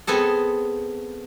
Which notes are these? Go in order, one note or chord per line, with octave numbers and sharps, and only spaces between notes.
B3 C4 G#4 A4